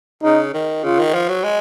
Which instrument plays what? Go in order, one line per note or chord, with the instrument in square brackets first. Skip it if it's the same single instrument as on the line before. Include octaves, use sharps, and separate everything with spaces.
[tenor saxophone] C#3 [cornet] D#4
[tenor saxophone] D#3
[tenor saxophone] C#3 [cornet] F4
[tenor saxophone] D#3
F3
F#3
G#3